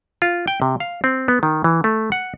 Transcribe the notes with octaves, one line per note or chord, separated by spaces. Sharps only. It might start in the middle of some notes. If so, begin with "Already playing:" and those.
F4
G5
C3
F5
C4
B3
D#3
E3
A3
F#5